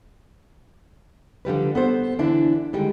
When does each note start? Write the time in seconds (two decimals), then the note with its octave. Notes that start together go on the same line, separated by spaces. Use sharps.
1.45 D3 F3 G3 B4
1.75 B3 A4 C5
2.19 D3 E3 D4 E4 A5
2.73 D3 D#3 G3 G#3